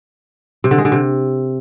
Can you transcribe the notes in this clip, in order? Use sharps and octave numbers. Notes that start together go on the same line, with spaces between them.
C3
D3
G#3
D3
C3